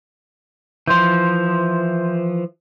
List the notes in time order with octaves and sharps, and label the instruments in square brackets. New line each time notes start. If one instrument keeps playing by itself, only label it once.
[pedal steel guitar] E3 F3 [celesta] C6 G6